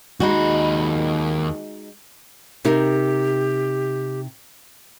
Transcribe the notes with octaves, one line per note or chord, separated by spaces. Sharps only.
D#2 G#3 D#4 F#4 B5
C3 D#4 G4 A#4